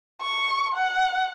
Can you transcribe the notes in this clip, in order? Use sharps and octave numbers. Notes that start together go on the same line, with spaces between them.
C#6
F#5